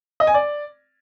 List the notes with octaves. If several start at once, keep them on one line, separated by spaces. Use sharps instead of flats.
D#5
G#5
D5